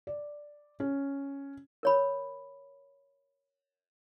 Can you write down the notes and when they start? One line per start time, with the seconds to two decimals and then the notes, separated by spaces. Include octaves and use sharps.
0.07 D5
0.80 C#4
1.83 A#4 C#5 B5